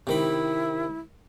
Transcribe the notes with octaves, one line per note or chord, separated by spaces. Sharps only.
C3 D#3 E4 B5